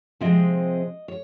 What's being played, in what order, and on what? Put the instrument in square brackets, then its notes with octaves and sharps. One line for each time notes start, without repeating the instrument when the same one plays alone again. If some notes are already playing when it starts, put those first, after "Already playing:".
[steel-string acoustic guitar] C3 F3 G#3 C4 D#5
C#5